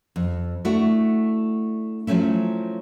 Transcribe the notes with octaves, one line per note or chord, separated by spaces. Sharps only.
F2
A3 D4 E4 F#4
F3 F#3 A3 C#4 E4